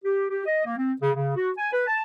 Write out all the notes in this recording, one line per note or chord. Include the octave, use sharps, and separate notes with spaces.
G4
G4
D#5
A#3
C4
C#3
C#3
F#4
G#5
B4
A5